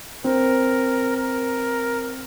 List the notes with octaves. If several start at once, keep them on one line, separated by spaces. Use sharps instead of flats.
C4 A#4
A#4